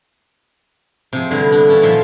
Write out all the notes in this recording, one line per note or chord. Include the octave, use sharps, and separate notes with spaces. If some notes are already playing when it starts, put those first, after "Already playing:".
C3 F3 G#4
G2 D3 E4
B3 D4
E3 C#4 A5
A#2 D#3 F3 E5 A5 C6